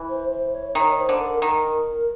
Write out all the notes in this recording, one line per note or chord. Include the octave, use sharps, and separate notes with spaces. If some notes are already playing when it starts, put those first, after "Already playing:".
Already playing: E3
C5
C5
C#5
D#3 C#5
C5
D3
A#4
D#3 A#4